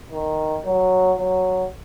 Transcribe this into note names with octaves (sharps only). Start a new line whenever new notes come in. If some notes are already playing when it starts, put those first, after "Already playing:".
D#3
F#3
F#3